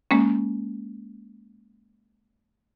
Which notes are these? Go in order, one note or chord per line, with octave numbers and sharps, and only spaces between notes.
G#3 A#3 C#4